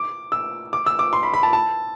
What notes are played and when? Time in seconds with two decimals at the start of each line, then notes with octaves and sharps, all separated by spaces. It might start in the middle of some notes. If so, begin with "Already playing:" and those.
Already playing: D6
0.32 E6
0.73 D6
0.86 E6
0.99 D6
1.13 C6
1.23 B5
1.34 B5
1.43 A5
1.53 A5